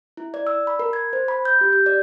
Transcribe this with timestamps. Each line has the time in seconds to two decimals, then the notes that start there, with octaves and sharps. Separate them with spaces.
0.17 E4
0.34 D5
0.47 E6
0.67 B5
0.79 A#4
0.93 G#6
1.13 C5
1.28 B5
1.45 G6
1.61 G4
1.73 G6
1.86 D5